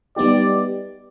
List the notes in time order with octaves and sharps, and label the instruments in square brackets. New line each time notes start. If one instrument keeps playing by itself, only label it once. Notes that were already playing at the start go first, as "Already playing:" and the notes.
[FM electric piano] G3 B3 D#4 G4 [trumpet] D5